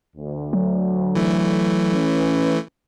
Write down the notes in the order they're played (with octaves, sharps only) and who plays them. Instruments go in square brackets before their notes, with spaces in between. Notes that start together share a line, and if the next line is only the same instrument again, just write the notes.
[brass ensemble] D2
[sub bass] F#3
[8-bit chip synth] E3 A3
[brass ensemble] C#4 B4